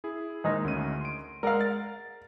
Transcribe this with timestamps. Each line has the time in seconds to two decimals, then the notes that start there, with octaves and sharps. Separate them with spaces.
0.04 E4 G#4
0.44 D#2 G#3 D#4
0.64 D2 C#4 D#7
1.01 C6 D7
1.43 G#3 A#4 D5 F5 F#5
1.61 A6